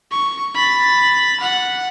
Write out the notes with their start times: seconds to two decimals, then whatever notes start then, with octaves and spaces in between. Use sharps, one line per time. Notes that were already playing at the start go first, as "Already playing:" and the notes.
0.12 C#6
0.55 B5 A6
1.41 F#5